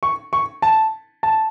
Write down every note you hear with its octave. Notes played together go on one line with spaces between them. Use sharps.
C#6
C#6
A5
A5